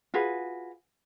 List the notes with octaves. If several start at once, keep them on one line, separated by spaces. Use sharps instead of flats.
F4 F#4 G#4 B4